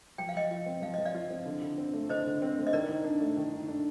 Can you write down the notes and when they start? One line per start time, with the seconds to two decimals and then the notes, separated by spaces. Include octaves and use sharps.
0.18 F3 G5
0.29 F5
0.35 F3 D#5 G5
0.51 F4
0.66 C4
0.82 F3 F5
0.94 F3 D#5
1.05 D5 F5
1.15 F4
1.30 C4
1.46 D3
1.62 D3
1.78 C4
1.94 A3
2.09 D3 C5 D#5
2.26 D3
2.42 C4
2.58 A3
2.67 D#5
2.73 D#3 A#4 D5
2.89 D#3
3.04 D4
3.20 A3
3.37 D#3
3.53 D#3
3.68 D4